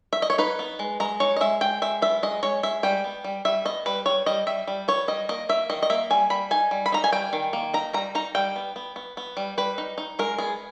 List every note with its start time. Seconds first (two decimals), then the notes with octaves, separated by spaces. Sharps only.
0.13 E5
0.22 D#5
0.30 C#5
0.38 D#4 B4
0.59 B3
0.79 G#3
1.00 G#3 A#5
1.20 D#4 C#5
1.36 D#5
1.41 G#3 E5
1.61 G#3 G5
1.82 G#3 E5
2.02 B3 E5
2.23 G#3 D#5
2.43 G#3 C#5
2.63 G#3 E5
2.83 G3 G5
3.04 B3
3.24 G3
3.45 G3 E5
3.65 B3 D#5
3.86 G3 B4
4.06 G3 C#5
4.26 G3 D#5
4.47 G3 E5
4.67 G3
4.88 B3 C#5
5.08 G3 D#5
5.29 A#3 D#5
5.49 A#3 E5
5.70 D#3 D#5
5.82 D#5
5.90 A#3 E5
6.10 G3 G#5
6.30 G3 B5
6.51 D#4 G#5
6.71 G3
6.86 B5
6.92 D#4 A#5
7.04 G#5
7.12 G3 G5
7.33 D#3
7.53 A#3
7.74 D#4 A#5
7.93 G3 A#5
8.15 D#4 A#5
8.35 G3 G5
8.56 B3
8.76 B3
8.96 B3
9.17 B3
9.37 G3
9.58 G3 B4
9.78 D#4
9.98 D#4
10.19 G#3 A#4
10.38 B3 G#4